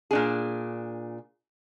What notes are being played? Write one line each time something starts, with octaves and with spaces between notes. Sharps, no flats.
A#2 D4 G#4